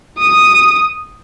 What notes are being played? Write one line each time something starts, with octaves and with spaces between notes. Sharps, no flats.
D#6